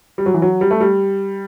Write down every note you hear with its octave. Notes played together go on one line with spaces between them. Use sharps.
G3
F#3
E3
F#3
G3
A3
G3